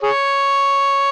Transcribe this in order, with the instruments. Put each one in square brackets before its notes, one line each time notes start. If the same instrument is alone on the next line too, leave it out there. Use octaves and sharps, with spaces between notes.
[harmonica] G#4 C#5